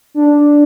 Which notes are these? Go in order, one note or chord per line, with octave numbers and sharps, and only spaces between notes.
D4